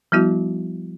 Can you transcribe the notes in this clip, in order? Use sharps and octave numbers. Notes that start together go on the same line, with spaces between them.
F3 G3 B3 E4 F#4